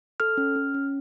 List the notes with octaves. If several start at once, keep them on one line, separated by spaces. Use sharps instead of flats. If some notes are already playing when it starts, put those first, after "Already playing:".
A4 F6
C#4
C#4
C#4